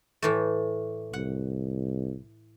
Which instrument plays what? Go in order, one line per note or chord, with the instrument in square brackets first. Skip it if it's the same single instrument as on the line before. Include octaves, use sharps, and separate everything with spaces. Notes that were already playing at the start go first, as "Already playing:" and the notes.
[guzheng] A2 E3 A3
[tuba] C2 [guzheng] F#5